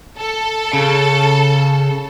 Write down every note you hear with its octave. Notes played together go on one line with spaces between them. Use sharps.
A4
C#3